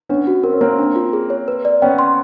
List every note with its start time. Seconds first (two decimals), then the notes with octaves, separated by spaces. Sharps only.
0.09 B3 C#4 D4
0.27 F#4
0.43 C4 A#4
0.53 C#4
0.61 A#3 C4 C#5
0.79 D4
0.96 F4
1.13 G#4
1.30 C#5
1.48 B4
1.65 D5
1.82 B3 C#4 G5
1.99 C6